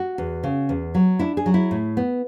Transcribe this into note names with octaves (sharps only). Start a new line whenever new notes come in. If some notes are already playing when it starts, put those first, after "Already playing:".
Already playing: F#4
E2
C#3
E2
F#3
D4 E4
G#4
F#3
E4
A2
B3